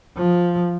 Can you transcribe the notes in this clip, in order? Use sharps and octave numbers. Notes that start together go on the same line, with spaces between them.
F3